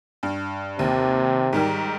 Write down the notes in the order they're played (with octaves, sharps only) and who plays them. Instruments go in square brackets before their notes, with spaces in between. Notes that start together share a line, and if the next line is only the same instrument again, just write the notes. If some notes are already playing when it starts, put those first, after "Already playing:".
[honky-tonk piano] G2
[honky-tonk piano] D#2 [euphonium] C3
[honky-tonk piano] G#2 D#3 G3